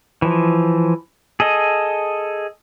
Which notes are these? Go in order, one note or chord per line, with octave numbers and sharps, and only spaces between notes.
E3 F3
G#4 A4 D#5